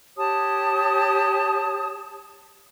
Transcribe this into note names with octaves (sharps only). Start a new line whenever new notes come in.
G4 C#5 A5 D#6